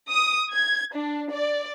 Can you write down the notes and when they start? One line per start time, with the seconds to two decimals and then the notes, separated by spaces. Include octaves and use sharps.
0.10 D#6
0.54 G#6
0.94 D4
1.32 D5